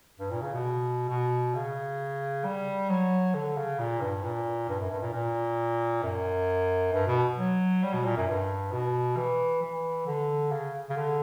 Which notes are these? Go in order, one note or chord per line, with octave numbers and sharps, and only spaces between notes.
G2
A#2
C#3
B2
B2
C#3
G3
F#3
D3
C#3
A#2
G2
A#2
G2
F#2
G2
A#2
A#2
F#2
G2
B2
F#3
G3
B2
A#2
F#2
G2
B2
E3
E3
D3
C#3
C#3
D3